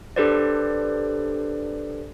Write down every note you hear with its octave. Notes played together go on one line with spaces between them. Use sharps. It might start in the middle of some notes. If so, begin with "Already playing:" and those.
D4 G4 A4 B4 C5 D5